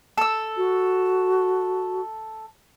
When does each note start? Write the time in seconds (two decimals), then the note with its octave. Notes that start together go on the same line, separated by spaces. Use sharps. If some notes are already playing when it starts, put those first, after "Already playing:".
0.18 A4 E6
0.57 F#4